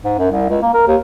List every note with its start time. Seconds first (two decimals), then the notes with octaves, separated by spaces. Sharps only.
0.05 G#2
0.19 F#2
0.31 C2
0.49 C#2
0.62 A#3
0.74 A#4
0.87 D#2